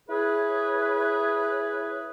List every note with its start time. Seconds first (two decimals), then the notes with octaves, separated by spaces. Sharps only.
0.09 E4 G#4 B4 C#5